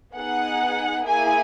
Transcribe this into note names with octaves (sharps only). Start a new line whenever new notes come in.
B3 D#4 G#4 F#5
A#3 E4 G#4 G#5